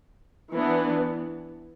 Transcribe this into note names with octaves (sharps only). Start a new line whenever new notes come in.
E3 B3 D4